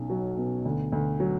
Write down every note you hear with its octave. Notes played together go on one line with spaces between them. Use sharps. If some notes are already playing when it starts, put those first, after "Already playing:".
Already playing: B1 C#4
F#3
B2
D2
D2
F#3